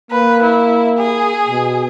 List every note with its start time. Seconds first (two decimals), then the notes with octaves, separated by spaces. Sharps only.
0.11 A#3 B4
0.43 E4
0.98 G#4
1.49 B2